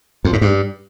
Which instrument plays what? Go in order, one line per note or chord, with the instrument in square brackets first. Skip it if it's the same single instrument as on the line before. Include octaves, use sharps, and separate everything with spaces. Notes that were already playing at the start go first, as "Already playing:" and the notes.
[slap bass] F2
G#2
G2